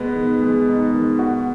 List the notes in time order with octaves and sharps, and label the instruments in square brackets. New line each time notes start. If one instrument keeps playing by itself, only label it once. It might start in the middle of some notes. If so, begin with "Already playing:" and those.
Already playing: [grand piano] B2 G#3 B3
[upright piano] D#3
G#3
D#4
D#3
F#4